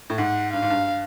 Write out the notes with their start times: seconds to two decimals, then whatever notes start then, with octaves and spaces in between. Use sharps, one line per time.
0.10 A2
0.17 G#2 F#5
0.53 G2 F5
0.62 G#2
0.70 G2